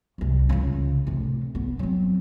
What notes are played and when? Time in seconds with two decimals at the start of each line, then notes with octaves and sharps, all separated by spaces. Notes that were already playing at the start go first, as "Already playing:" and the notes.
0.18 F#1 C2
0.49 C#2 C#3
1.07 A2 C3
1.55 B3
1.79 F#3 C4